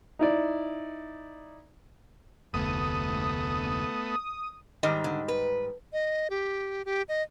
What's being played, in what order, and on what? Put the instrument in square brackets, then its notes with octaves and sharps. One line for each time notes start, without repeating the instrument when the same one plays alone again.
[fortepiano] D#4 E4 D5
[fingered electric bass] F1 D2 [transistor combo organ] A3 B3 [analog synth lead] D#6
[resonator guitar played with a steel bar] G#2 D#3 G3 [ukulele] D#5
[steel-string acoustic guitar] D3
B4
[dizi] D#5
G4
G4
D#5